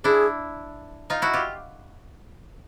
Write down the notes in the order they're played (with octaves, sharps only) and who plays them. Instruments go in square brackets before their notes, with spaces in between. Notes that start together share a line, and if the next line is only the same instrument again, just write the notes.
[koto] D4 E4 [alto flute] G#4
[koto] D#4 F4
E4 F#4
F4 G4